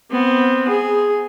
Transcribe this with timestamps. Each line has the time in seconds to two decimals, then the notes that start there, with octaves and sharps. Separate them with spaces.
0.11 B3 C4
0.69 G#4